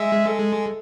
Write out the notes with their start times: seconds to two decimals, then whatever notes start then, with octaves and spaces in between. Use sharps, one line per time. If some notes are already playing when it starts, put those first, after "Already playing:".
Already playing: G#3 E5
0.27 A4